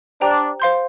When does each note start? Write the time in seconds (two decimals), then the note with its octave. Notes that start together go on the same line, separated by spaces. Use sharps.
0.21 D4 G4 C5 G5 A#5
0.60 C5 F5 C6 G6